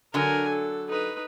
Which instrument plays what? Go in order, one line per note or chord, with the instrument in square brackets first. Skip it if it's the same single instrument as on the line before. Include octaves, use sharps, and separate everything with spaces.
[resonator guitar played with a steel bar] D3 F#3 [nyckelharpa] A#4 G#5
[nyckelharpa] A4
D#4 B4